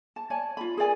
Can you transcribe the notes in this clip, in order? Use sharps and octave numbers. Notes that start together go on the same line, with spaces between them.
A5
C#5 D5 G#5 A5
F4 B5
G#4 A#4 D5 G#5